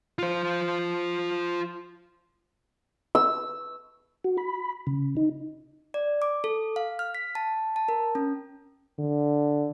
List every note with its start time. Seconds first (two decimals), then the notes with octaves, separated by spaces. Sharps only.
0.19 F4 C5
3.15 E6
4.24 F#4
4.38 B5
4.87 C#3
5.17 D#4
5.94 D5
6.22 D6
6.44 A4
6.76 F5
6.99 F6
7.15 B6
7.35 A5
7.76 A5
7.88 A#4
8.15 C#4
8.99 D3